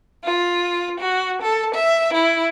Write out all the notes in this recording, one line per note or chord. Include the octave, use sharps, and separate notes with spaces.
F4
F#4
A4
E5
E4